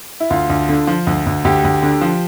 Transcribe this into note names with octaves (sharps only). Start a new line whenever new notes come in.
E4
D2 F4
D2
D3
F3
D2
D2
D2 G4
D2
D3
F3